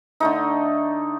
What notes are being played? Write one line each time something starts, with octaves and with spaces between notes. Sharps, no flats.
D3 A3 D#4